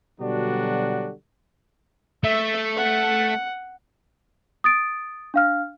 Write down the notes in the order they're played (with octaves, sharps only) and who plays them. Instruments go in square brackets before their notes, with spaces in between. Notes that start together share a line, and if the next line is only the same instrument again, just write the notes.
[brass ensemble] B2 D3 F#3 G3 D4 F#4
[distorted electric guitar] A3 [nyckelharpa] E5
[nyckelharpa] F#5
[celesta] D#6 A6 D7
D4 F5 F6